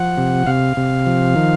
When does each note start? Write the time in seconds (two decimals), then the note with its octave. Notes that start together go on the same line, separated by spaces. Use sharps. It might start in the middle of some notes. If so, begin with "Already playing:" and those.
Already playing: F3 F#5
0.18 C3
0.46 C3 F5
0.77 C3
1.06 F3
1.36 D#3